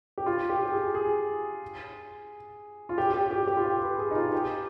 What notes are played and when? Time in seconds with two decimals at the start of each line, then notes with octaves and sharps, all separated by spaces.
0.18 G4
0.26 F4
0.49 G4
0.65 G4
0.72 G#4
0.94 G#4
2.89 F4
2.98 G4
3.14 G4
3.31 G4
3.47 G4
3.57 F4
3.65 G4
3.82 B4
3.99 G#4
4.11 D#4
4.15 F4
4.33 G4